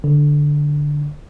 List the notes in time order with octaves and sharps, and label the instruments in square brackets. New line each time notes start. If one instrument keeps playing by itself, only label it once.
[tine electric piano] D3